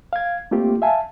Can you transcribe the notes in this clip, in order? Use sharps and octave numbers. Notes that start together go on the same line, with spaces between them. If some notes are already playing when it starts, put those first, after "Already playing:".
F5 G#6
A3 A#3 C4 F4 G4
E5 F5 G#5 A5